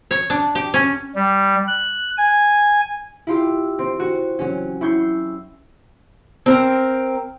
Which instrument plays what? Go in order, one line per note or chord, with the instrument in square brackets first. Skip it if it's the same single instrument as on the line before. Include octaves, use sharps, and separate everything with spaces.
[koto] C#5
D4
G4
C#4
[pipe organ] G3
F#6
G#5
[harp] E4 F4 G4
C4
F#4
F#3 C#4
E4 C#6 G6 C7
[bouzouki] C4 A#4